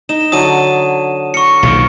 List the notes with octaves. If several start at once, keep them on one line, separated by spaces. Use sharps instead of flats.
D#4 E7
D3 F#3 A5 D#6 D#7
A#4 C#6 C#7
B1 A#2 D#3